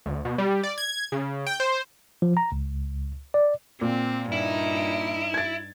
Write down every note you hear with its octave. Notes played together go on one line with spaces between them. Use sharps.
D2
B2
G3
D5
G#6
C#3
G5
C5
F3
A#5
C#2
D5
A#2 C4
G2 D#4 E4
G#6 A6